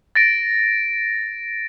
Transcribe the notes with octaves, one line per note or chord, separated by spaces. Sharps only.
A6 A#6 D7